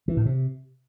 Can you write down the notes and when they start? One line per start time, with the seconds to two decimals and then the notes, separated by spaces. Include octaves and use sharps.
0.08 E3
0.17 A2
0.26 C3